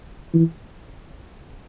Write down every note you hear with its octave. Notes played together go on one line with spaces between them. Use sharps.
E3